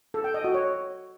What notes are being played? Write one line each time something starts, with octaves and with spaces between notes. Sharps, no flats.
A4
G5
D#5
F#4
C#5